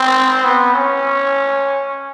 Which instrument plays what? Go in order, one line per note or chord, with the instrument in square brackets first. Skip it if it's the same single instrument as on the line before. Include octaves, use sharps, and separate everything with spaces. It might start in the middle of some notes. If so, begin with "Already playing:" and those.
Already playing: [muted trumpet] C4
B3
C#4